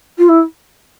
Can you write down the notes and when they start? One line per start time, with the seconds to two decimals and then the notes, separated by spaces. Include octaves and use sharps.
0.18 F4
0.28 E4